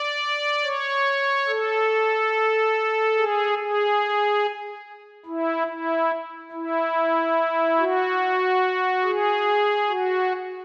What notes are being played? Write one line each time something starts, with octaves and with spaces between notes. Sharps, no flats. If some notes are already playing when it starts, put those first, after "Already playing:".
Already playing: D5
C#5
A4
G#4
G#4
E4
E4
E4
F#4
G#4
F#4